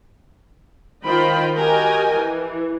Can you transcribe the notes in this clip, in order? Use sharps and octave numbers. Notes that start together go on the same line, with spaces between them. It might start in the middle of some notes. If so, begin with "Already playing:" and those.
D#3 F4 C5 D#5 G5 B5
F#4 G4 A#4 D#5 G5 G#5
E3